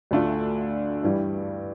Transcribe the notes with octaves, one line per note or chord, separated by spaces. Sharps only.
D2 D3 A3 D4 F4
G2 E3 G3